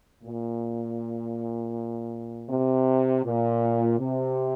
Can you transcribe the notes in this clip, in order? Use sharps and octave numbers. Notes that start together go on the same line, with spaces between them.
A#2
C3
A#2
C3